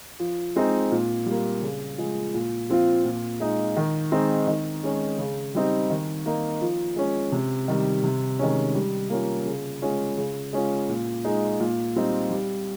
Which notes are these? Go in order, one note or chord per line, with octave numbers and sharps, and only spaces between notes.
F3
G#3 C4 D#4
A#2
G3 A#3
C#3
F3 G#3
A#2
F3 C4 F4
A#2
G#3 D#4
D#3
G#3 C4 D#4
D#3
G#3 C#4
C#3
G3 C4 D#4
D#3
A#3 D#4
F3
G#3 C#4
C3
D#3 G3
C3
D#3 G#3 C#4
G3
A#3 C#4 F4
C#3
G#3 C#4 F4
C#3
G#3 C#4 F4
A#2
G#3 D#4
A#2
G3 C4 D#4
G3